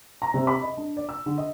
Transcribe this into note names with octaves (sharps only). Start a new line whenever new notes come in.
A#5
C3
B5
D#5
D4
D5
E6
D3
D#5